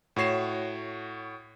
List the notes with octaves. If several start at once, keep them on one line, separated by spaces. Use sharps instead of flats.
A2 F#4 C#5 C7 E7